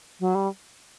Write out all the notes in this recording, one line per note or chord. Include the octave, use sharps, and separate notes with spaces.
F#3
G3